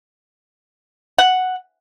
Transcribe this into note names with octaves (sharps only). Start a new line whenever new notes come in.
F#5